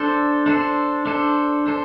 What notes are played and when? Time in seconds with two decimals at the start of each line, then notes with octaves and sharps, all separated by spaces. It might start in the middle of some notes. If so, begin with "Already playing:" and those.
Already playing: D4 A4 C5
0.46 D4 A4 C5
1.06 D4 A4 C5
1.67 D4 A4 C5